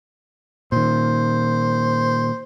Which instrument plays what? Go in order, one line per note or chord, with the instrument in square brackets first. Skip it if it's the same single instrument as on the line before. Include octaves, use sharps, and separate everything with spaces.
[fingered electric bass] A#2 D#3 [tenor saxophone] C5